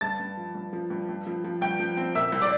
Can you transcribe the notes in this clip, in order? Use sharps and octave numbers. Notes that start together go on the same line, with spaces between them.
G2 A5 A6
G2
F3
G2
F3
G2
G2
F3
F3
G2 G5 G6
F3
C4
A#2 E5 E6
C2
D5 D6